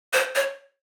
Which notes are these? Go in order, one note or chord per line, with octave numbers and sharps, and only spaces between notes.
C5
C#5